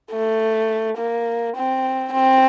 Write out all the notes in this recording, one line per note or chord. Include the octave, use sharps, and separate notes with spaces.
A3
A#3
C4
C4